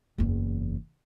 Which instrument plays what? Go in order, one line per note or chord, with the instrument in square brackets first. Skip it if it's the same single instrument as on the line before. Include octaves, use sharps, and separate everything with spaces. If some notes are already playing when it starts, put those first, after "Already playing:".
[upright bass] F#1 E2